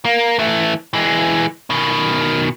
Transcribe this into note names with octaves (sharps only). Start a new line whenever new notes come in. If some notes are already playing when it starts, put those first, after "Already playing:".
A#3
E3 A3
E3 G#3
B2 D#3